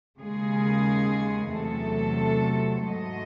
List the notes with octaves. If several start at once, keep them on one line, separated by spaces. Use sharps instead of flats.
D#2 C#3 G#3 G#4
E2 C3 F#3 A3 A4
G#2 F#3 A3 D#5